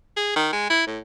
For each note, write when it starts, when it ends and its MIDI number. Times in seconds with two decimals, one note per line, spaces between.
0.17 0.32 68
0.36 0.48 51
0.53 0.66 56
0.70 0.86 64
0.87 0.99 45